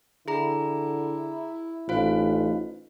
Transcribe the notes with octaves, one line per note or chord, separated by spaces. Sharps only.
D3 E4 G#4 A#5
A1 D#4 F4 C5 F5